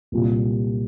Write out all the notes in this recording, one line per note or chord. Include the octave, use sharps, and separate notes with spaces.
C2 A#2 G3